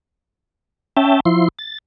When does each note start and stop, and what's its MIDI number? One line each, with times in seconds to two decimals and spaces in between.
0.97 1.20 61
0.97 1.20 76
0.97 1.20 79
0.97 1.20 81
1.25 1.48 53
1.25 1.48 64
1.25 1.48 84
1.59 1.78 93